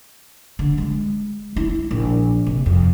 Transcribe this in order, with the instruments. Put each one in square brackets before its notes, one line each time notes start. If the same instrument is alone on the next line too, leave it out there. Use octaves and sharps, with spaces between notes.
[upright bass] D3
G#3
E4
A#1
C3
F2